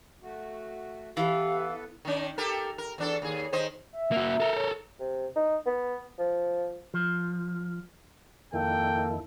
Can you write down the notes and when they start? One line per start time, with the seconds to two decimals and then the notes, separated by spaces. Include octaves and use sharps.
0.22 A3 F#4
1.17 E3 B3 G4 A4 B4 F5
2.05 D#3 C#4
2.38 G4 A4 A#4
2.78 A#4
2.98 E2 D4 A4
3.22 D#2 G#4
3.53 D#3 C5 D#5
3.93 E5
4.12 A#3 F#4
4.40 A4 A#4
4.56 C#5
5.00 C3
5.36 D#4
5.66 B3
6.19 F3
6.94 F3
8.53 F2 D#3 A#3 E4 A4 G5